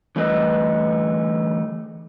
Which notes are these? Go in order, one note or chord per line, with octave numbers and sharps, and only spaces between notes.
D3 E3 G3 A3 B4 D#5